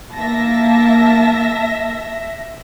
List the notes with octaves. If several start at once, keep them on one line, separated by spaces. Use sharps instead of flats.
A#3 E5 A5 A#6